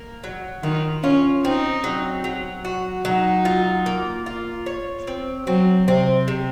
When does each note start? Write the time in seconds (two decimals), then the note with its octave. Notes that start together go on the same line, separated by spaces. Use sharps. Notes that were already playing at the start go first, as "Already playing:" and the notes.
Already playing: A#3
0.24 F#3
0.63 D#3 F4
1.03 C#4 F4
1.44 C4 D#4
1.84 F#3
2.24 F#3
2.65 F#4
3.05 F#3 D#4
3.45 F4
3.86 A#3
4.26 F4
4.66 C#5
5.07 C4
5.47 F#3 C4
5.88 C3 C4
6.28 C3